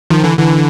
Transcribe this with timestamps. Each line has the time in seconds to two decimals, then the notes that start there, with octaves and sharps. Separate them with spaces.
0.10 D#3 F3
0.24 D3 E3
0.38 D3 E3